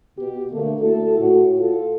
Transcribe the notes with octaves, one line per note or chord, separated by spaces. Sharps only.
B2 G4
D3 A3 A#3
A3 E4 F#4 A4
A2 F#4
F4 A4